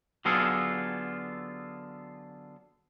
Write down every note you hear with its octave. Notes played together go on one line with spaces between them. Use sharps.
D3 F#3 B3 F4 G#4 A4